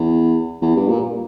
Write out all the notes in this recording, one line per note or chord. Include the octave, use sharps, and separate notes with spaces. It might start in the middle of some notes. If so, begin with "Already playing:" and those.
Already playing: E2
E2
G2
A#2